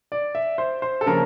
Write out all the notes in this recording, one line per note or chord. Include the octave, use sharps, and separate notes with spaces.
D5
E5
C5
C5
A4
C#3 F3 A#3 C#4 A#4